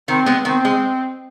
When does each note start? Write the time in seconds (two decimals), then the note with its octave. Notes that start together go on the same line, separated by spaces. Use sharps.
0.08 D#3 C4
0.26 G#3 B3
0.45 D#3 C4
0.65 G#3